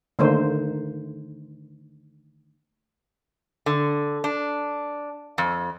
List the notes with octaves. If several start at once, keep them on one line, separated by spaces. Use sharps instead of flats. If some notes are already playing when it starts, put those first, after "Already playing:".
D3 D#3 A3 A#3 D#4 C5
D3
D4
F2